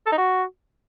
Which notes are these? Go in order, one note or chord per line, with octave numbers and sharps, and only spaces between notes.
A4
D#4
F#4